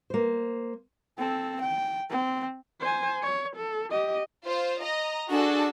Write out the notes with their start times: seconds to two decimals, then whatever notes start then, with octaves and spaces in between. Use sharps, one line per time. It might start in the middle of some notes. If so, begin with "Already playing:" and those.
0.10 A#3 C5
1.18 C4 A4
1.61 G5
2.10 C4
2.80 C5 G#5
3.23 C#5
3.56 A4
3.91 G4 D#5
4.45 F4 C5
4.83 D#5 A#5
5.30 D4 F#4 G#4 A4